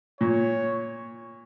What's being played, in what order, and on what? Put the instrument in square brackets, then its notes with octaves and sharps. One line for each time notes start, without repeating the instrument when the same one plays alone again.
[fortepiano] A#2 [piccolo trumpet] C#5